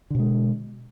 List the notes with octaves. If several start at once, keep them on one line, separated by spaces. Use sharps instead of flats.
B2 D3 G#3